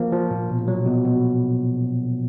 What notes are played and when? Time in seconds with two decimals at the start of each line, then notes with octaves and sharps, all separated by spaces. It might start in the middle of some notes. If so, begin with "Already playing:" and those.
Already playing: F3 A#3
0.12 F3
0.31 A#2
0.50 B2
0.68 F#3
0.86 B2
1.05 B2